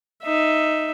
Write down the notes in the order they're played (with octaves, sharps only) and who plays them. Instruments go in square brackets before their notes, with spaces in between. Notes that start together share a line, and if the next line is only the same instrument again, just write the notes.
[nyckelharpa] D#4 E5